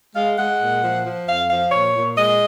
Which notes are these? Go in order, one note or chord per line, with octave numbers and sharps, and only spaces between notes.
G#3 F5
G#3 F#5
A#2
F3
F3
F2 F5
F3 F5
A#2 C#5
A#2
G#3 D#5